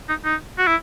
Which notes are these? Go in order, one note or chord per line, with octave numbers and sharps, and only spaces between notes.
D#4
D#4
F#4
E4